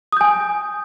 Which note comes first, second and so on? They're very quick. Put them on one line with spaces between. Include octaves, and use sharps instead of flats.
D#6 G6 G#5